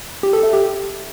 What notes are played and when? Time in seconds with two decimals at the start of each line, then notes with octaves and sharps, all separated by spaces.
0.23 G4
0.33 A4
0.43 E5
0.53 G4